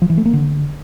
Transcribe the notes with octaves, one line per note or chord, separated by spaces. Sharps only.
F3
E3
A3
A#3
D3